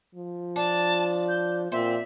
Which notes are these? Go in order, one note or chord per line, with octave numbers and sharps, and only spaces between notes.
F3
D4 A5
G6
A#2 C4 E5